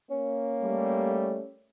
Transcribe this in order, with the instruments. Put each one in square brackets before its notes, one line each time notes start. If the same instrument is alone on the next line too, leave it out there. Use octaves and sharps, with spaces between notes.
[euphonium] A#3 [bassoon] C#4
[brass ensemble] G3 A3